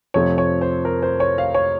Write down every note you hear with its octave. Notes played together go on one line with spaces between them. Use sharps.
F2 C3 F3 A3 C4 C#5
C#5
C5
A#4
C5
C#5
F5
C#5